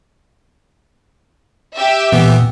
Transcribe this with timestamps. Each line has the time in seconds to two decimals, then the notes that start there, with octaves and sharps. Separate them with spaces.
1.76 G4 E5
2.12 A#2 E3 B3